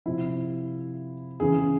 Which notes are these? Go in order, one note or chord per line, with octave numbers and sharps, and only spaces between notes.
C3 F3 E4
C#3 E3 G#4